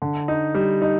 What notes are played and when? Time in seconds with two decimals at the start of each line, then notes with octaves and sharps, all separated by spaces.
0.02 D3
0.28 D#4
0.54 G3
0.82 D#4